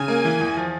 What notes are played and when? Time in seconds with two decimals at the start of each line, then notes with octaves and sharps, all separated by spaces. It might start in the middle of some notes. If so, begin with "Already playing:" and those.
Already playing: C#3 G#5
0.08 A#3
0.25 E3
0.40 E2
0.57 F3